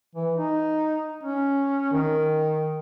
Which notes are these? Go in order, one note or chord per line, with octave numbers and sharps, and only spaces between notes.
E3
D#4
C#4
D#3